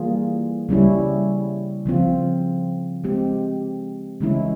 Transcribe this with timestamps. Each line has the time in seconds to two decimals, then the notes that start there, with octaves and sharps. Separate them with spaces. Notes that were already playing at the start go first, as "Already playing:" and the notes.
Already playing: E3 G3 A#3 F4 G#4
0.69 C#3 G3 C#4 E4
1.86 C#3 F3 C4 F4
3.04 G#3 C4 G4
4.21 C#3 E3 G#3 C#4 E4